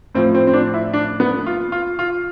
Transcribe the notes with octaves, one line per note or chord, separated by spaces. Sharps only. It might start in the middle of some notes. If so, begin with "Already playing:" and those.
A2 F3 C4
C4
C4
D4
E4
D4
B3
F4
F4
F4